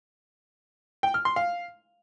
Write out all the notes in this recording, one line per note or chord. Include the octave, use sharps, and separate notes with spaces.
G5
F6
C6
F5